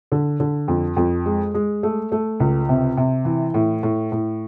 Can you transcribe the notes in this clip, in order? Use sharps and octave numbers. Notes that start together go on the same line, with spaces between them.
D3
D3
F2
F2
G#3
G#3
A3
A3
C#2
C3
C3
E3
A2
A2
A2